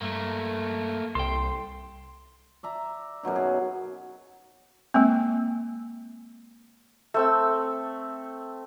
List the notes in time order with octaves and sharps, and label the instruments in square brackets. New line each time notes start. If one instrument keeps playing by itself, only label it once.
[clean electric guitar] G2 [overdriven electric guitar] A3 A#3
[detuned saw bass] C2 [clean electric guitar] A4 G5 [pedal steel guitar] C6
[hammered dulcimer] D5 E5 A#5
F#2 B2 F#3 D#4
G#4
[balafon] G#3 A#3 C4
[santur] A3 C4 E6